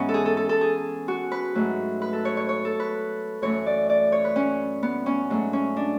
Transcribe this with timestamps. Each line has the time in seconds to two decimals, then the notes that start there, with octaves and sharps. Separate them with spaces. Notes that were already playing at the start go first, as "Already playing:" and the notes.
Already playing: G#2 E3 G#3 B3 C#4
0.09 A4
0.14 G#4
0.26 A4
0.37 A4
0.49 A4
0.61 G#4
1.08 F#4
1.32 B4
1.55 G#2 F#3 A3
2.02 B4
2.13 A4
2.25 C#5
2.37 C#5
2.49 C#5
2.65 A4
2.80 B4
3.42 F#2 E3 A3 C#5
3.66 D5
3.89 D5
4.12 C#5
4.25 B4
4.36 C#4
4.83 B3
5.06 C#4
5.30 G#2 F#3 A3
5.53 C#4
5.76 D4